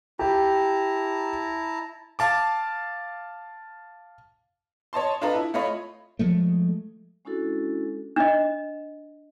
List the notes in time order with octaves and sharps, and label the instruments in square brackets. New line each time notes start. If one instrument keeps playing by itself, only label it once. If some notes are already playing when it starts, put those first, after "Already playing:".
[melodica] E4 A5 A#5 [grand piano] G4
[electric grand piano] F5 A5 D6
[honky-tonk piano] C#5 D#5 A5 C6
D4 F4 A4 B4 D#5 A#5
E4
A3 F4 C#5 D#5 B5
[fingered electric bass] F3 G#3 A3
[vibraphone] G#3 C#4 D4 E4 F#4 A4
[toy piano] D4 D#5